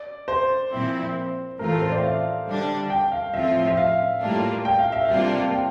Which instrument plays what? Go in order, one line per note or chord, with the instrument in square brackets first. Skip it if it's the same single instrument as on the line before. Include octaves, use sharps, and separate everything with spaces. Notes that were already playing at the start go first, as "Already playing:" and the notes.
Already playing: [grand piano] D5
C5
[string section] A#2 F3 C4 E4
[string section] A2 E3 A3 C4 F4 [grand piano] A#4
[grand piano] A4
C5
D5
E5
F5
[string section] D3 G3 D4
[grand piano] G5
F5
[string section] A2 F3 C4 F4 [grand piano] E5
[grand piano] E5
F5
[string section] A2 G3 A#3 D4 F4
[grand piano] G5
F5
E5
[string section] C3 G3 A#3 D4 F4 [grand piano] F5
[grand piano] G5